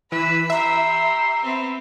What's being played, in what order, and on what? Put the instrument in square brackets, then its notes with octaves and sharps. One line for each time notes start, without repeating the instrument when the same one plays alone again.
[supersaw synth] E3 [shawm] B4 [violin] B5 E6
[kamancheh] G4 A#5 [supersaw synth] E5 [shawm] C6
[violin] B3 C4